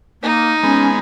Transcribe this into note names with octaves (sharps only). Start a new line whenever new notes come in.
A#3 D#4
G#3 B3 C#4